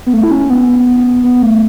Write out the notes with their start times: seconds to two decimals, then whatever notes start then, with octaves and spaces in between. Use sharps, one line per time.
0.07 B3
0.13 A3
0.23 E4
0.32 C#4
0.50 B3
0.68 B3
1.24 B3
1.42 A3